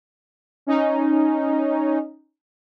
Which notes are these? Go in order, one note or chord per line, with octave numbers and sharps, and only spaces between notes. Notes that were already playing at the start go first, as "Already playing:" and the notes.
C#4 D#4